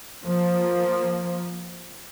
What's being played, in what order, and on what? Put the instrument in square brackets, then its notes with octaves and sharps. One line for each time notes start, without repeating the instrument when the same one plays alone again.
[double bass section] F3 A#3